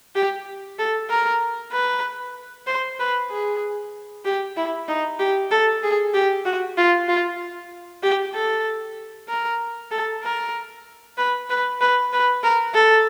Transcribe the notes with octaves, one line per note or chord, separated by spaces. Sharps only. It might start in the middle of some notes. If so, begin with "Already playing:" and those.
G4
A4
A#4
B4
C5
B4
G#4
G4
E4
D#4
G4
A4
G#4
G4
F#4
F4
F4
G4
A4
A#4
A4
A#4
B4
B4
B4
B4
A#4
A4